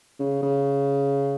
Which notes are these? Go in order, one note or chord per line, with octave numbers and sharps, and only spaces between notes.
C#3
C#3